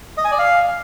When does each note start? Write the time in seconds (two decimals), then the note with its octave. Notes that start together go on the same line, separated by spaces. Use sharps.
0.17 D#5
0.24 G#5
0.31 D5
0.38 F5